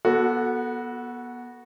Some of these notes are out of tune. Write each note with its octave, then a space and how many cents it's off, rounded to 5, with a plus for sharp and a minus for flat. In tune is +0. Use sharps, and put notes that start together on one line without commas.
B3 -25 F#4 +0 A4 +0